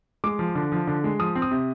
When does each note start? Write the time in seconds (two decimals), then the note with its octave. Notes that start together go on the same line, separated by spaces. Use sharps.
0.24 G#3 D6
0.39 F3
0.55 D3
0.72 F3
0.87 D3
1.04 G#3
1.19 F3 D#6
1.35 C4
1.42 D#6
1.51 C3